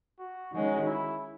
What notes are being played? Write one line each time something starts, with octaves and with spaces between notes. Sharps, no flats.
F#4
D#3 G#3 C#4 F#4
E4